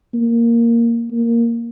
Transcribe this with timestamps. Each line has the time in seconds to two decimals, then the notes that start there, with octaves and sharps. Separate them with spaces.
0.14 A#3
1.11 A#3